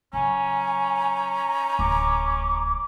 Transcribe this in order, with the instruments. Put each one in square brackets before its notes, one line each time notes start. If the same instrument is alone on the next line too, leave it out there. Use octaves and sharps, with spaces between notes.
[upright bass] C#3 F#3 [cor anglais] C#4 [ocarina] G#5 [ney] A#5
[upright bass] D1 C2 [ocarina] D6